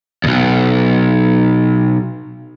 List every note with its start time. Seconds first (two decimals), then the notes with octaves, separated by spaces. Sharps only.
0.24 B1 E2